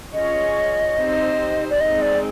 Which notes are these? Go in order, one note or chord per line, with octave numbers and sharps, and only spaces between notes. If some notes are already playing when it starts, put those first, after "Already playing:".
C#4 F4 G#4 C#5 D#5
C4 D#4 G4 C5
D5
G#3 C4 D#4 D#5
D5